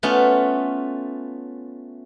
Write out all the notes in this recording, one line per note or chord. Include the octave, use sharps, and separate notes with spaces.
A3 B3 C#4 F4